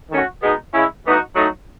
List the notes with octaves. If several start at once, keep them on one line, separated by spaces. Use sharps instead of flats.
D#3 A3 C#4 F#4
B2 G#3 B3 D#4
C#3 G#3 C#4 E4
A2 E3 B3 D#4 F#4
A2 F#3 A3 D#4